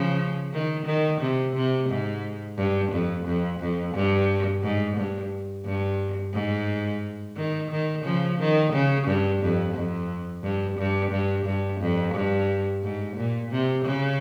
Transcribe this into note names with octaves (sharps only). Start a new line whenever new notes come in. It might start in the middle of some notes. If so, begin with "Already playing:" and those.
Already playing: C#3 F3
D#3
D#3
C3
C3
G#2
G2
F2
F2
F2
G2
G#2
G2
G2
G#2
D#3
D#3
C#3 F3
D#3
C#3
G2
F2
F2
G2
G2
G2
G2
F2
G2
G#2
A#2
C3
C#3